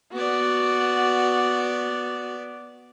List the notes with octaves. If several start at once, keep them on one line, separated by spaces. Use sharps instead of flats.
B3 F#4 D5